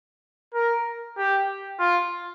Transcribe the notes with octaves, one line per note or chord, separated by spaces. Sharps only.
A#4
G4
F4